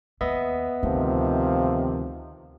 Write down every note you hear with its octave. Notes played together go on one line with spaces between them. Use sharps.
D#2 B3 D#5 E5
D2 C3 D#3 F3